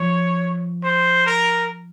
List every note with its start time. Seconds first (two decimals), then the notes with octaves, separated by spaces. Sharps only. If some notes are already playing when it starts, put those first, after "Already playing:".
Already playing: F3 C#5
0.83 C5
1.26 A#4